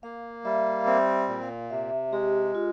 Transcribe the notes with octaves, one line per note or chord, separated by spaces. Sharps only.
A#3 F5
G3 E5
F5
C4 E5
A#2
F5
C3 E5
G#3 G4
F4